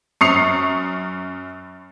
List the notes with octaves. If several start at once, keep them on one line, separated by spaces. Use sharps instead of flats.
F#2 C#6 D#6 C7 C#7 F7